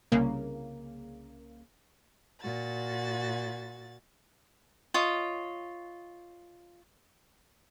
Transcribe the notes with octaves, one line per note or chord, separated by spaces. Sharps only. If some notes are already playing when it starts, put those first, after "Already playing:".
C2 C#3 A#3
A#2 F#4 A6
F4 C#5 D#5